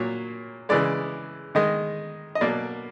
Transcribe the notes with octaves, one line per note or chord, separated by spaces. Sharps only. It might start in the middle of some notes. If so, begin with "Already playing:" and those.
Already playing: A#2 F#3 A#3 C#5
C#3 E3 G#3 D5
D#3 G#3 D#5
D#5
B2 F#3 A#3 D5